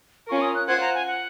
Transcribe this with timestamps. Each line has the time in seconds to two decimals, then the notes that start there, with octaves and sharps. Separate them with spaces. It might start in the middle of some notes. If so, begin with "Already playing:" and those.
0.29 C#4 F4 A#4 C#6
0.42 D#6
0.55 F#6
0.68 F4 C5 F#5 G#6
0.81 A#5
0.94 G#5
1.07 F#5